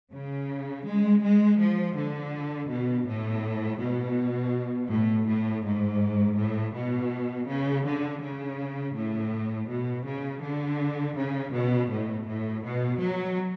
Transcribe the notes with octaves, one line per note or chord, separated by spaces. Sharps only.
C#3
G#3
G#3
F3
D3
B2
A2
B2
A2
A2
G#2
A2
B2
C#3
D3
C#3
A2
B2
C#3
D3
C#3
B2
A2
A2
B2
F#3